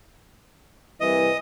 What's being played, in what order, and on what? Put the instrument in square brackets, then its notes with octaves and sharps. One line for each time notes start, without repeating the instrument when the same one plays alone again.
[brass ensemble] C2 E3 [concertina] D#5